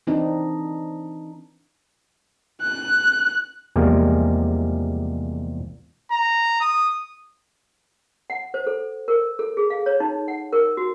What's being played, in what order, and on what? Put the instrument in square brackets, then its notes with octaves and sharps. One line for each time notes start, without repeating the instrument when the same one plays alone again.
[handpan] E3 C4 D4 D#4
[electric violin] F#6
[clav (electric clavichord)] E2 C3 F3 G3 G#3 A#3
[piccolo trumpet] A#5
D#6
[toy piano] F#5
C5
A4
A#4
A4
G#4
F5
C#5
D#4
F#5
A#4
F#4